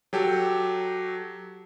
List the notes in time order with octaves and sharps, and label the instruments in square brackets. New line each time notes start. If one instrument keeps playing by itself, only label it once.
[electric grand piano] F#3 G4 A4